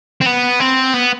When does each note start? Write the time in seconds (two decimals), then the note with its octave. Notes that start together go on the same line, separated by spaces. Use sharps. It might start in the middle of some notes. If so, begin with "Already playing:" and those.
0.21 C4
0.26 B3
0.60 C4
0.94 B3